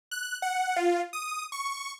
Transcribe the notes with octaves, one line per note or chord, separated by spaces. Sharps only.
F#6
F#5
F4
D#6
C#6